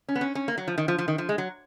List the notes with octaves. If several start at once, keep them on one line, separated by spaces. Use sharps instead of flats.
C#4
B3
C#4
C#4
A#3
F#3
F3
D#3
F3
F3
D#3
F3
G#3
F#3